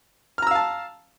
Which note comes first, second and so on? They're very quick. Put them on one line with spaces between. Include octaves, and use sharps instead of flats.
F6 A#5 E6 F5 A5